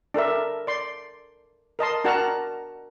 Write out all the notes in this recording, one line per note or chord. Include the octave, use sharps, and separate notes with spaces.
D4 A4 A#4 E5
D5 C6
A#4 D#5 A5 C6
D4 F#4 A#4 F#5 A5 A#5